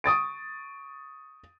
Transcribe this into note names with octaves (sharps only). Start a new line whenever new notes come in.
C#6 D#6 A6 D7